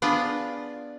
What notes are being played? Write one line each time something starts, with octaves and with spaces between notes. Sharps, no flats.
B3 D4 F4 G#4 B4